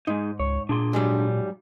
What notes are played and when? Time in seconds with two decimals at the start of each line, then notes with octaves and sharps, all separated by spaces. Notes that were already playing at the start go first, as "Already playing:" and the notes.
0.07 G#2 G#3 D#4
0.40 C#2 C#5
0.69 A#2 D4 G#4 C6
0.93 G#2 F#3 G3